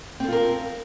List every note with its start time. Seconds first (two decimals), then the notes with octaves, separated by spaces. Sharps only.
0.20 C4
0.24 A4
0.28 F4
0.32 A#4